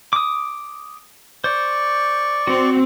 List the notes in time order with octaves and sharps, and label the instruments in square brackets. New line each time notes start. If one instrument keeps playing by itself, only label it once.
[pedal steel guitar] D6 D#6
[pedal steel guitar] C5 [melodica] D5 C#6
[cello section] C4 [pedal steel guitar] F#4